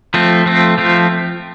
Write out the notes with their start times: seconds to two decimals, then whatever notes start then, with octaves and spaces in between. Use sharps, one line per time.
0.14 F3 A3 C4
0.46 F3 A3 C4
0.78 F3 A3 C4